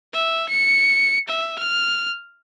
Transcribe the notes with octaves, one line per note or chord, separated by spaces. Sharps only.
E5
C#7
E5
F6